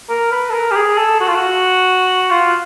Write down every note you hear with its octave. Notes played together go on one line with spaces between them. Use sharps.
A#4
B4
A4
A#4
G4
G#4
A4
F#4
F4
F#4
F4